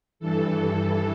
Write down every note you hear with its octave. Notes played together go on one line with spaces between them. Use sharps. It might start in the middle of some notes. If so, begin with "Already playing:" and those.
G2 E3 A4